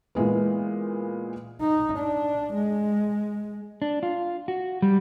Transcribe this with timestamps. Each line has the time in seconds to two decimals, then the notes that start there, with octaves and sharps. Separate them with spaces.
0.15 A#2 E3 G#3 B3
1.61 D#4
1.99 D4
2.54 G#3
3.82 D4
4.03 F4
4.48 F#4
4.82 G3